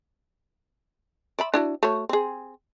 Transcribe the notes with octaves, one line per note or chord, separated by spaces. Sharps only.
D5 E5 B5
D4 E4 F#4
A3 F#4 C#5
C4 G#4